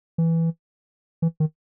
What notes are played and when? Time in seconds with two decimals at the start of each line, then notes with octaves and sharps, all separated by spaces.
0.18 E3
1.22 E3
1.40 D#3